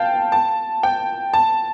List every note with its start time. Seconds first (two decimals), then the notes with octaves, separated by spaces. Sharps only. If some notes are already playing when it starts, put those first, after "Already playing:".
Already playing: F5 G5 A5
0.32 A5
0.83 G5
1.34 A5